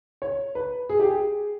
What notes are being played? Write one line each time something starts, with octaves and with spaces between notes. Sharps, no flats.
C#5
B4
G#4
G4
G#4